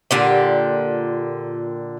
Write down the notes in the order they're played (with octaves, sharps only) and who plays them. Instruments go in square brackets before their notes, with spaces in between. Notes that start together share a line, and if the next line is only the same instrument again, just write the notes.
[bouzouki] A#2 D3 G4